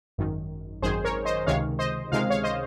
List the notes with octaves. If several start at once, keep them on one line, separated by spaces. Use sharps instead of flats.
G#1 F#2 D#3
G#1 F#2 D#3 G#4 C5
A#4 C#5
C5 D#5
C#2 C3 D#3 G#3 C#5 F5
C5 D#5
C#2 C3 D#3 G#3 F5
C#5 F5
C5 D#5